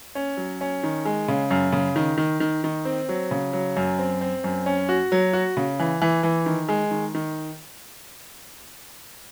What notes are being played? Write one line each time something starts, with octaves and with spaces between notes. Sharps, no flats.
C#4
F#3
C#4
D#3
G#3
C#3
F#2
C#3
D#3
D#3
D#3
D#3
C4
F#3
C#3
F#3
F#2
C4
C4
F#2
C#4
F#4
F#3
F#4
C#3
E3
E3
E3
D#3
G#3
D#3
D#3